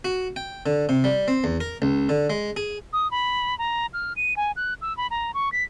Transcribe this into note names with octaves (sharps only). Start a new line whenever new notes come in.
F#4
G5
D3
C3
G3
C4
E2
A#4
C#2
D3
G#3
G#4
D#6
B5
A#5
F6
D#7
G#5
F#6
E6
B5
A#5
C#6
B6